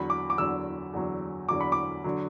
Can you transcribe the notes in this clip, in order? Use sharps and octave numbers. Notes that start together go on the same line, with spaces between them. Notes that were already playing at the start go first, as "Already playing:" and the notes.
Already playing: E2 D3 F#3 B5
D6
D6
E2 D3 F#3 E6
E2 D3 F#3
E2 D3 F#3 D6
B5
D6
D3 F#3